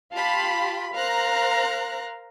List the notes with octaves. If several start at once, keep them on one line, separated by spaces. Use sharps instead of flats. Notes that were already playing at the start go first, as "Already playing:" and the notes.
F4 G4 F5 A5 B5
A#4 C5 F5 A#5 F#6